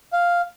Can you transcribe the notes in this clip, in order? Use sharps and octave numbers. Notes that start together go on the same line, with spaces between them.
F5